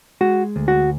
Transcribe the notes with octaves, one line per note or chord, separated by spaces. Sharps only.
G#3 F#4
D2
F#4